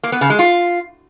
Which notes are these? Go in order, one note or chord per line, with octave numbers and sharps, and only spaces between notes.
A#3
B3
C#3
G#3
F4